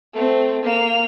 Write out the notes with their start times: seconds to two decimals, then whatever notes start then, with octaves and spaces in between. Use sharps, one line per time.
0.14 A3 C4
0.63 A#3 F7